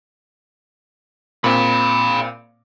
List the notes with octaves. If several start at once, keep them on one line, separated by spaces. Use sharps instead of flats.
A#2 C4 F5 B5